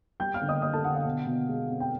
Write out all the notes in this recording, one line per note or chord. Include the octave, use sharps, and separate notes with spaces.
G3 G5 G6
F5 F6
D3
D#5 D#6
A#3 D#5 D#6
A4 A5
D3 F#5
F5
B2
B2
G#3
C4
G5